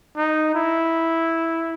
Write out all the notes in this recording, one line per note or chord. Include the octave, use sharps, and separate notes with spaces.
D#4
E4